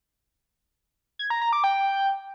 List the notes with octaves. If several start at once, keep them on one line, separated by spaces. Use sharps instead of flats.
G#6
A#5
A#5
D6
G5